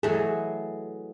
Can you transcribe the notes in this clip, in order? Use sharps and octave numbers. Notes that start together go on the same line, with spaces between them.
E3 F#3 A3 G#4